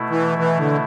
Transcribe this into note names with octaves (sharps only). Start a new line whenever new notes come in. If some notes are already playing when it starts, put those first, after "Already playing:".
Already playing: B2 A3 E4
E3
E3
D3